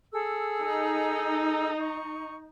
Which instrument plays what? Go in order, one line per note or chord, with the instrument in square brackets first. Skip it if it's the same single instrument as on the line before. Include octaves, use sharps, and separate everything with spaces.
[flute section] G#4 A4 E6
[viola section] D#4
[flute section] C#6